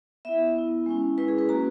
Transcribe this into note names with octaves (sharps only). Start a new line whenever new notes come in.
B3 E4 E5
B3 E4
G#3 C#4 E4
G#3 C#4 E4 B4
G#4
B4
A#3 C#4 F#4 A#5